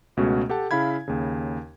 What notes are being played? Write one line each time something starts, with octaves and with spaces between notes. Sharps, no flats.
C#2 B2 G#3 A3 C#4 F#4
G4 A4 F#5 G5 A5
C#3 E4 F5 B5 G#6
D#2 C#3